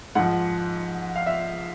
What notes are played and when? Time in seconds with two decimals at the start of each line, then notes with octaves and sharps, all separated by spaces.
0.15 G#2 F3 F#5
1.16 F5
1.26 E5